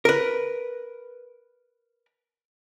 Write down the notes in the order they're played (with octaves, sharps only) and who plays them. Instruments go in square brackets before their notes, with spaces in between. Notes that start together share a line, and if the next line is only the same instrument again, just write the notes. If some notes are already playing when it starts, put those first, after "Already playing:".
[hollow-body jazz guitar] A#4 B4